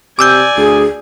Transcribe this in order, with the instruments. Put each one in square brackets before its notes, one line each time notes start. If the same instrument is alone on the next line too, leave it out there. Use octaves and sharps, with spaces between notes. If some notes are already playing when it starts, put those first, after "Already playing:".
[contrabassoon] C3 [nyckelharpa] D5 G#5 [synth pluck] D6 E6 G6
[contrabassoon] D2 [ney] G#4